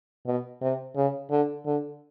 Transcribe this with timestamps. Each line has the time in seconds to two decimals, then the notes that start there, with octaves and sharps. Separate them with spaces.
0.27 B2
0.61 C3
0.96 C#3
1.31 D3
1.66 D3